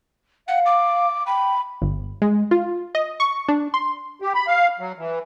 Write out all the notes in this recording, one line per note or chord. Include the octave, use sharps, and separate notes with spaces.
F5 F#5
D6
G5 B5
G1
G#3
F4
D#5
C#6
D4
C6
G4
B5
F5
F#3
E3